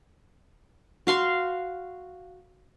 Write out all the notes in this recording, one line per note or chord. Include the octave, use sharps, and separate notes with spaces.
F#4 F5 C6 C#6